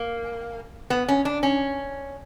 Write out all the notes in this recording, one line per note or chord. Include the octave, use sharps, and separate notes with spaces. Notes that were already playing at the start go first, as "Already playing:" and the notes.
Already playing: A#3
B3
C#4
D4
C#4